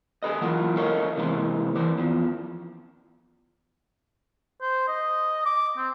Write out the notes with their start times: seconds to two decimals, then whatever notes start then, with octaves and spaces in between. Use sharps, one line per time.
0.23 G#4 A4 B4 D#5
0.42 E3 F#3 A#3 F4 F#4
0.77 A4 A#4 C#5 D#5 F5
1.17 C3 E3 G#3 A#3 C4
1.75 E3 C5 D5
1.98 E2 F3
4.62 C5
4.87 D#5
5.46 D6
5.77 C4